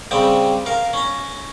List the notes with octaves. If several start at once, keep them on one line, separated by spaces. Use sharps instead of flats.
C#3 G3 C4 G5
A#4 F5
C#4 A#5